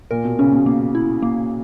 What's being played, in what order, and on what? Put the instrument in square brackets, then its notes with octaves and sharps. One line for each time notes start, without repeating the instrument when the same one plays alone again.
[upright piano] A#2 [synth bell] A#4
[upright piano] B2
[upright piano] C#3 [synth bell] C#4
[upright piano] B2
[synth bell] A#3
E4
A#3